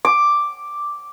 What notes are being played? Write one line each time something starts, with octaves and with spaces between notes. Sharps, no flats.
D6